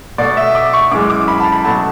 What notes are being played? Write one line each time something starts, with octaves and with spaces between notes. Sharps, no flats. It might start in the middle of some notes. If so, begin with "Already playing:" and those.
B2 A3 D5
E5
D6
C#6
F#2 E3 G#3 D6
D6
B5
A5
B5
B2 F#3 A3 A5